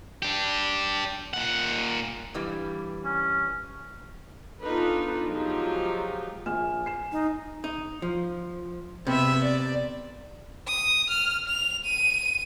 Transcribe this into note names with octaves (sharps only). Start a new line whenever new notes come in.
D4 G4
A#2 F#5
G2 E3 G3
C#4
B3 D4 D#4 F4 A4 B4
F3 F#3 G#3 D#4 F4 G4
A#1 G#5 F6 E7
C7 E7
D#4
D#4
F3
C3 B3 E5
D5
D#6
F6
F7
D#7